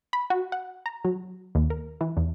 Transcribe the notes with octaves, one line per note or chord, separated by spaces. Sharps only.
B5
F#4
F#5
A#5
F#3
D#2
A#4
E3
E2